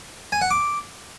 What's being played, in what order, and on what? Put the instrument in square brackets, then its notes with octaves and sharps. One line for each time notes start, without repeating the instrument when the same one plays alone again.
[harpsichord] G#5
F#5
D6